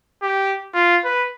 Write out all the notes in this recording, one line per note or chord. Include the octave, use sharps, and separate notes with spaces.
G4
F4
B4